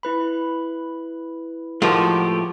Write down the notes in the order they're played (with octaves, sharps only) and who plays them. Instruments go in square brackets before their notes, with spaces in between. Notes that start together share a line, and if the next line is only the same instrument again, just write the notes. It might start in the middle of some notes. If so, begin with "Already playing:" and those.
[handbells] E4 B4 B5
[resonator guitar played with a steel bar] A2 F3 [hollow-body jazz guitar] G#3 F#4 A#4 [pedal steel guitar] A3 G4